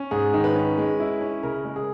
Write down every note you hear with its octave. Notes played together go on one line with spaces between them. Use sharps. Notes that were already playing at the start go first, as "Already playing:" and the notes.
Already playing: C#4
G#2 G#4
D#3
B4
C#4
G#3
E4
C#4
C#3 A#4
G#3
G#4